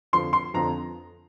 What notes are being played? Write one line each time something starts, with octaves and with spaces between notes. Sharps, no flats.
F2 D3 F3 C6
C6
F2 D3 F3 A#5